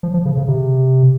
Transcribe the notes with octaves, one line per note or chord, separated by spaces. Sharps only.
F3
F3
C#3
C#3
C3